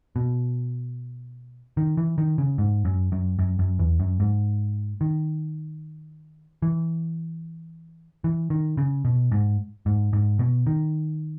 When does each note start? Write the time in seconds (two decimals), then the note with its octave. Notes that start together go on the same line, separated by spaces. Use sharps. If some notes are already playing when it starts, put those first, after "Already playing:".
0.16 B2
1.77 D#3
1.97 E3
2.18 D#3
2.38 C#3
2.58 G#2
2.85 F#2
3.12 F#2
3.39 F#2
3.59 F#2
3.79 E2
4.00 F#2
4.20 G#2
5.01 D#3
6.62 E3
8.24 E3
8.50 D#3
8.77 C#3
9.05 B2
9.32 G#2
9.86 G#2
10.13 G#2
10.39 B2
10.67 D#3